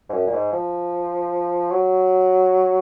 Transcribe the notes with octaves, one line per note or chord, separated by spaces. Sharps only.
G#2
F#2
A#2
G#2
F3
F#3